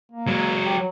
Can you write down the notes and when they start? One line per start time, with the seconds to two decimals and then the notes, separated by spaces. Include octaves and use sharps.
0.12 A#3
0.27 F#3 G#3
0.65 G4
0.78 F#3